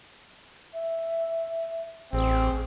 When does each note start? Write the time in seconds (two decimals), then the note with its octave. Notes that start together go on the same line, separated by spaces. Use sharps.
0.74 E5
2.13 A1 C4 G#4